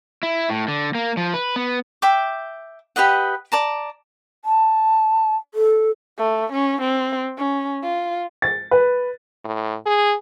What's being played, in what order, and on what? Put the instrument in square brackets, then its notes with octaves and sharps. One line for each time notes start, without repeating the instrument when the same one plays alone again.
[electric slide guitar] E4
A2
D3
A#3
F3
B4
B3
[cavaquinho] E5 G5 D6
G4 B4 D#5 F#5
D5 A5 A#5
[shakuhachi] A5
A4
[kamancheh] A3
C#4
C4
C#4
F4
[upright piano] A6
B4
[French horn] A2
G#4